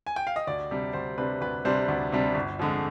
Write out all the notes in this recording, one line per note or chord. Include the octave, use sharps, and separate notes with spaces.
G#5
G5
F5
D#5
D2 D5
C3 G3 D4
D2 C5
C3 G3 D4 B4
D2 B4
C3 G3 D4 C5
D2
C3 G3 D4
G1
F2 D3 G#3